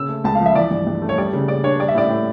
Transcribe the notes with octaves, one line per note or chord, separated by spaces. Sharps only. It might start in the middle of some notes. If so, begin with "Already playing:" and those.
Already playing: C#3 E6
A3
C#2 A5
F5
F3
E5
E3 D5
G2
G2
A3
C#5
G3 D5
C#3
C#3 D5
D4 C#5
G3 D5
E5
A2 D5
A2